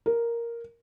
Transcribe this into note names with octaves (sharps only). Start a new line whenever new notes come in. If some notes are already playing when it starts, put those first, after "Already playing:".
A#4